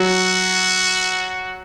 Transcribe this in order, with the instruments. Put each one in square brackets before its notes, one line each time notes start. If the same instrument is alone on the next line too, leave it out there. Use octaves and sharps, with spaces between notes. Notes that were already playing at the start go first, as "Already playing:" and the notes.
Already playing: [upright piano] F#3 [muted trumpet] F#4